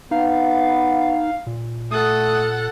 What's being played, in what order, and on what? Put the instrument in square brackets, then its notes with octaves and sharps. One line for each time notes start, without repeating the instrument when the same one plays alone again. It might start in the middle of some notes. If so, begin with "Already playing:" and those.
[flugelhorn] B3 [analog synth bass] D#4 [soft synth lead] F5
[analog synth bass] A#2
[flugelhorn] A3 [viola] A4 F#5 [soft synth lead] D#6